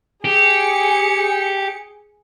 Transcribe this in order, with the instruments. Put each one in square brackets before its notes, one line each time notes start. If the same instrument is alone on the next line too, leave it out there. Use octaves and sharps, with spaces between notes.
[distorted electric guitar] G4 [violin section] G#4 C#7